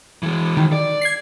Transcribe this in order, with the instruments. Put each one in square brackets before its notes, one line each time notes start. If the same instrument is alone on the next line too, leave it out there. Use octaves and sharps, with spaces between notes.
[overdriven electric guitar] E3 G#3
[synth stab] D#3
[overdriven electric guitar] D5
[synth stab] G#6 C7